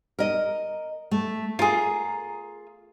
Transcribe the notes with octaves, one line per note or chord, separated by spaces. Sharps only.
A#4 D#5
A3
F4 G#4 A#4